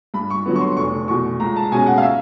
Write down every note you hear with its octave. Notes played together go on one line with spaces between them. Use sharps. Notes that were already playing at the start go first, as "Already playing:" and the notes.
G2 B5
C#6
D3 F#3 B3
C#6
C6
F1 C#6
E2 B2 C#6
C#2 A#5
A5
B2 G#3 C#4 G#5
F#5
F5
E5